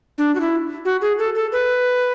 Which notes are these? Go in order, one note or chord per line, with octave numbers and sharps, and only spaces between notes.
D4
F#4
E4
F#4
G#4
A4
A4
B4